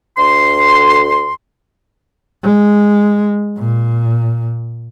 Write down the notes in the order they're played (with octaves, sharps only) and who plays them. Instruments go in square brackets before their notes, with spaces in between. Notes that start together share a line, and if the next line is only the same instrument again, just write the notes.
[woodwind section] D2 C6
[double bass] G#3
A#2